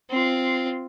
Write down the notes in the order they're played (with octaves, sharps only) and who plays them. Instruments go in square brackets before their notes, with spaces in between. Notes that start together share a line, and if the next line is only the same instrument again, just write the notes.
[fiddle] C4 F4